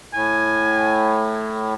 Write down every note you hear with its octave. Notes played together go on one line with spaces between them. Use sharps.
A2 G#5